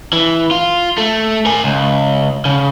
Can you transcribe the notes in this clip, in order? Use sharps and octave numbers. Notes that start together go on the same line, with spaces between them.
E3
F4
A3
A#4 G#5
C#2
C#3